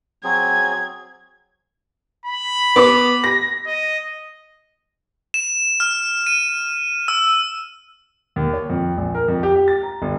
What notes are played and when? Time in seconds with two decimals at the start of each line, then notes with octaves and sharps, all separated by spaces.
0.24 F#3 C4 G#4 G#6
2.26 B5
2.76 B3 D6
3.24 A#6
3.67 D#5
5.34 E7
5.80 F6
6.27 D#7
7.08 E6
8.36 D#2
8.53 C#5
8.70 F2
8.98 A#1
9.15 A#4
9.28 F2
9.43 G4
9.56 G4
9.68 A6
9.83 A#5
10.02 G1